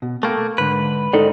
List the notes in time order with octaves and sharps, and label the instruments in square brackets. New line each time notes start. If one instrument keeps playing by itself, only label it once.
[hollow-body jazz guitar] B2
[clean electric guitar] A3 A#3 [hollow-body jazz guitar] A4 G5 B5
[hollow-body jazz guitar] G#2 D3 C5 [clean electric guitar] B4
[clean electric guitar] G#2 D#3 [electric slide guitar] D#4 A4 D5